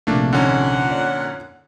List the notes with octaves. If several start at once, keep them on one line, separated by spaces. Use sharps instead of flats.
A#1 C3 A3 A#3 D4
F2 A#2 D3 C#4 D#4 F#5
C#5 D5